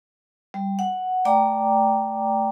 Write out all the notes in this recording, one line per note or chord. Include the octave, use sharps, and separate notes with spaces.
G3
F#5
A3 D5 G5 A#5 D6